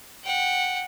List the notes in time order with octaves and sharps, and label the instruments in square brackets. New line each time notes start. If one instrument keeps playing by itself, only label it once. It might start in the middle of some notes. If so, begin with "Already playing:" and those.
[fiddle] F#5 G5